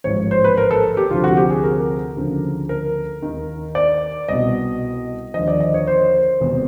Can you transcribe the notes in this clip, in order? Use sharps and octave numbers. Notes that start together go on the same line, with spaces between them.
A1 G#2 F3 C#5
C5
B4
A#4
A4
G4
D2 C3 F3 F4
F#4
G4
G#4
A#4
D2 C#3 F3
A#4
D#2 D#3
D5
C2 B2 D#5
D#2 D3 F3 D#5
D5
D#5
C#5
C5
E1 E2 C3